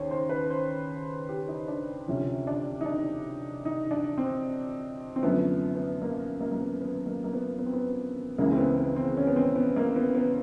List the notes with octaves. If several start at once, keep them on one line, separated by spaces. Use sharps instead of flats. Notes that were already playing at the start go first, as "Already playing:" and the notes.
Already playing: D#2 C#3 C5 C#5
C5
B4
C5
G4
D#4
D4
D2 C3 F3 C#4
D4
D#4
D4
D#4
D4
C4
C4
F#2 D3 F3 A3 B3
B3
A#3
A#3
A#3
B3
B3
A#3
A#3
B3
B3
C4
B3
C#2 C#3 E3 G#3 A#3
C4
B3
B3
C4
C#4
B3
C4
B3
A#3
B3
B3